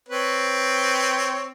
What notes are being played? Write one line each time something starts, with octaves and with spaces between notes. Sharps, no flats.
C4 B4 C#5